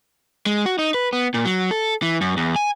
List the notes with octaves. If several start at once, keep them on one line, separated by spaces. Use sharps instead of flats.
G#3
F#4
D#4
B4
B3
A#2
F#3
A4
E3
F#2
E2
G#5